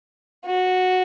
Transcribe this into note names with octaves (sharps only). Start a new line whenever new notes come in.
F#4